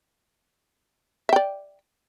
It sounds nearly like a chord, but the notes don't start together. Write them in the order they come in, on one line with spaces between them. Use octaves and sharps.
E5 G5 D5